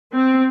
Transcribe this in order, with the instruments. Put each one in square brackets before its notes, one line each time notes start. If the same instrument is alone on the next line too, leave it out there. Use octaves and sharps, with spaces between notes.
[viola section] C4